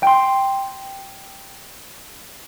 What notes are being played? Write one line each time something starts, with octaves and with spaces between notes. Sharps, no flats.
G5 C6